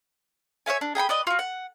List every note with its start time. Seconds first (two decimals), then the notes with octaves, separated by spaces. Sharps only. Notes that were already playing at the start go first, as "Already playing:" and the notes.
0.66 C#5 E5 F5 G#5
0.81 D4
0.95 G#4 G5 A#5 B5
1.09 B4 D5 D#5
1.27 F4 F#4
1.39 F#5